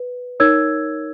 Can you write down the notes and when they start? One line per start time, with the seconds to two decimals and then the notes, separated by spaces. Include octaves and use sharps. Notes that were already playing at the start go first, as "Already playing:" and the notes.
Already playing: B4
0.40 D#4 A#4 C#5 E6 G#6